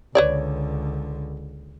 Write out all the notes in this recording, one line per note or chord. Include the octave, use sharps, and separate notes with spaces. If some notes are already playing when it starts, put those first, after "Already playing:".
C#2 D3 B4 C#5 D5